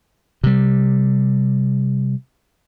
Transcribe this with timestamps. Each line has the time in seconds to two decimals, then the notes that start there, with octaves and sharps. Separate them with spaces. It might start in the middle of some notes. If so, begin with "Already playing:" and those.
0.44 C3 G3